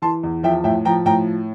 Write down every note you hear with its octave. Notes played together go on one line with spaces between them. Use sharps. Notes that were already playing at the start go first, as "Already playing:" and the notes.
E3 A5 C6
E2
F3 E5 G5
A2 E5 G5
F3 G5 A#5
A2 G5 A#5